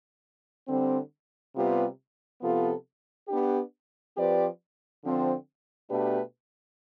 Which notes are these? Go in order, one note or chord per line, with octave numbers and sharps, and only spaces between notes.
D3 G3 C4
C3 G3 B3 F4 B4
C3 F3 B3 F4 A4
B3 D4 G4
F3 C4 G4 B4 D5
D3 F3 C4
B2 A3 D4 G4 B4